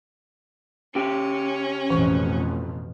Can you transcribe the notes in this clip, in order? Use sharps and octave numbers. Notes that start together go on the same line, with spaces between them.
C#3 C#4 G4
A1 F2 B2 E3 C#6